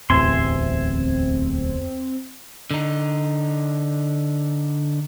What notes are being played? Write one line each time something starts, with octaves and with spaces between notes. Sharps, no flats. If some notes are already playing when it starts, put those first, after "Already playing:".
D1 A1 E2 C4 E5 G#5 C6
D3 D#4